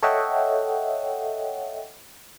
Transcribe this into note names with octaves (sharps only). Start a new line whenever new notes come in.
A4 C#5 D#5 E5 F#5 G5